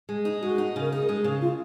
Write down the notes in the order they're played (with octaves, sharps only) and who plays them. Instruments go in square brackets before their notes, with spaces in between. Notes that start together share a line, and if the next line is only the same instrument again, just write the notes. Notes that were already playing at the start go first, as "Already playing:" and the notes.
[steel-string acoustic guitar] G#3
D#4
[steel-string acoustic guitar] G#3 [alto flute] F#4
[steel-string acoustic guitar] D#4
[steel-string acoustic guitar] C#3 [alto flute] A#4
[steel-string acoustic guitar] D#4 [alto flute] G#4
[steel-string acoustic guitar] G#3
C#3
[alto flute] F4